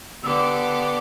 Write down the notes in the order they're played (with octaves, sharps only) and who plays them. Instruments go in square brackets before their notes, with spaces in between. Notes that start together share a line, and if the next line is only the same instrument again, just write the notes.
[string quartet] D3 B3 G4 D5 [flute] D6 E6